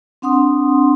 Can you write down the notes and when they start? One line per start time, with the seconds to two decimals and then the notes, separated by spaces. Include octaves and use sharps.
0.22 C4 D4 F#5 C6 D#6